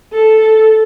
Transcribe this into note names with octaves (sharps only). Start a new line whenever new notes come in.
A4